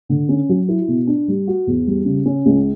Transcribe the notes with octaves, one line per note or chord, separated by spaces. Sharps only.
D3
C#4
F#3
E4
B2
D4
G3
F#4
E2
G3
C#3
C#4
C#2